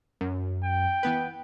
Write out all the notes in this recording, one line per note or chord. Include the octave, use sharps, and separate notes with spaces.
F#2
G5
E3 B3 B4